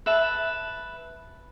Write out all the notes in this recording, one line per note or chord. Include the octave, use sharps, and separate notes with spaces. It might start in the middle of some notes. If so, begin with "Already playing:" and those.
B4 E5 A5